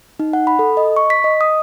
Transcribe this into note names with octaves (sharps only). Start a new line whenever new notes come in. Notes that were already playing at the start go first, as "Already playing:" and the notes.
D#4
F#5
B5
A4
D#5
C#6
B6
D#5
D#6